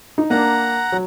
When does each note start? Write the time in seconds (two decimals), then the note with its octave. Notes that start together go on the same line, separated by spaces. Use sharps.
0.18 D#4
0.30 A#3 D4 F#5 A#5
0.92 F#3